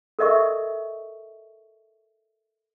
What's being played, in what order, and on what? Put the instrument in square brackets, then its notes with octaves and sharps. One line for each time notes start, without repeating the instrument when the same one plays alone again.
[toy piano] A4 A#4 D#5 E5 C#6